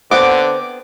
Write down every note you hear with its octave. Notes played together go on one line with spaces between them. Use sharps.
D3 B3 C4 C5 F#5 D6